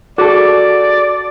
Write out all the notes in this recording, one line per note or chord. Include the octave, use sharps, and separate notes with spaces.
F#4 G#4 A4 D5